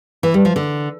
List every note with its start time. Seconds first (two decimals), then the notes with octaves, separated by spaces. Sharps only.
0.23 E3
0.34 G3
0.45 F3
0.56 D3